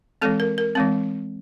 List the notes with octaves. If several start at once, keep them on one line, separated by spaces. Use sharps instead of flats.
E3 G#3 C4 A4
A#4
A#4
E3 G#3 C4